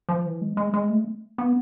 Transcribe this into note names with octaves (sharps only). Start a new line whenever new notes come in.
F3
E3
G#3
G#3
G#3
A3
B3